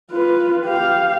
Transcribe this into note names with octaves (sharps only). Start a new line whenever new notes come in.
F4 B4
G4 F5